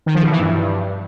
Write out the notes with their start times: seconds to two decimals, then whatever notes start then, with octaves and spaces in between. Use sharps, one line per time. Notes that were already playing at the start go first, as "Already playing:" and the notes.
0.06 D#3
0.15 F3
0.23 B2
0.31 E3
0.40 G2